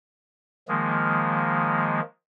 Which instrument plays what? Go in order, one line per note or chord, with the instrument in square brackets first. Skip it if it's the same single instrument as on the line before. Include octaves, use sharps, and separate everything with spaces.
[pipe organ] D#3 F3 G#3 A#3